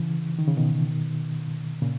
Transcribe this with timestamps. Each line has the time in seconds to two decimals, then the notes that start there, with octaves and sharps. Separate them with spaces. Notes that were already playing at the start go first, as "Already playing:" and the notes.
Already playing: C#3 E3
0.39 D#3
0.47 C#3
0.57 B2 D#3
1.82 A#2 C#3